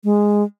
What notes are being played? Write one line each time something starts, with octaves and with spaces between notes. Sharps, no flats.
G#3